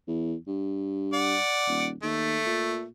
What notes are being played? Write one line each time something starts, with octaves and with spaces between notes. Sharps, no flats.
E2
G2
D5 F#5
D#1
D#2 A3
A#2